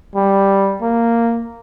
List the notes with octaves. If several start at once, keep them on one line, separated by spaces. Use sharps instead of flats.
G3
A#3